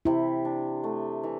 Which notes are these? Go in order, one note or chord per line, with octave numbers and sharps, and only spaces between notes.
C3 E4
D4
A3
E3